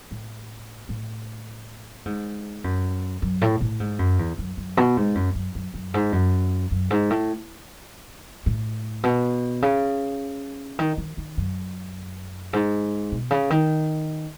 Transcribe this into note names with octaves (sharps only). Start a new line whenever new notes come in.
A2
A2
G#2
F#2
F#2
A2
A2
G#2
F#2
E2
F#2
F#2
B2
G#2
F#2
F#2
F#2
F#2
G#2
F#2
F#2
G#2
A2
A2
B2
C#3
D#3
D#3
D#3
F#2
G#2
B2
C#3
D#3